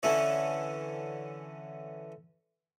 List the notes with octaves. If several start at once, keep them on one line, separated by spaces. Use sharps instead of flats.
D3 E3 A3 C#4 E4